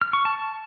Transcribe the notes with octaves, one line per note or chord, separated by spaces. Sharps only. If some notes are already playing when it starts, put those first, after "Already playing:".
F6
C#6
A5